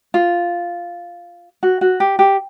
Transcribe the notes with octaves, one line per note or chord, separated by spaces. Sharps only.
F4
F#4
F#4
G4
G4